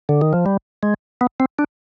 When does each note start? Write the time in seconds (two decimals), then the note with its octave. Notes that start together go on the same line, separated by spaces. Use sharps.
0.09 D3
0.21 D#3
0.33 F3
0.46 G3
0.83 G#3
1.21 B3
1.40 C4
1.59 D4